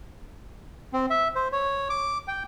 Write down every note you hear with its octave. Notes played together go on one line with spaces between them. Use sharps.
C4
E5
C5
C#5
D6
G5